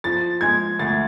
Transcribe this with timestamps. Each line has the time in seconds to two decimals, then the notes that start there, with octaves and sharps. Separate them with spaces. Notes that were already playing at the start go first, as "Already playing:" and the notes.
0.04 F3 A6
0.41 G#3 G#6
0.79 D2 A6